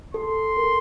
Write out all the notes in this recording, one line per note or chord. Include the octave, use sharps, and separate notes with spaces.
A4 C6
A#4
A4